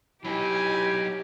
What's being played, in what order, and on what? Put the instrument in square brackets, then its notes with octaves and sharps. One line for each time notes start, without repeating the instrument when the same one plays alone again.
[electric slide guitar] F#3 D#4 [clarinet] E4 [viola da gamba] G4 [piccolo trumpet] G#5